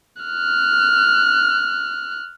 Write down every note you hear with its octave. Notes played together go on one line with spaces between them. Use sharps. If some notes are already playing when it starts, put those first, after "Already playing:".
F6 F#6